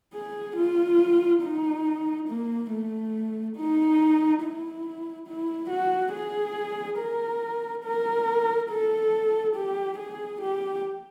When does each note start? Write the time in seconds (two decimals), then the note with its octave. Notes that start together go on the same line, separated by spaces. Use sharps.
0.14 G#4
0.57 F4
1.43 D#4
2.28 A#3
2.71 A3
3.56 D#4
4.42 E4
5.27 E4
5.70 F#4
6.13 G#4
6.99 A#4
7.84 A#4
8.70 A4
9.56 G4
9.99 G#4
10.41 G4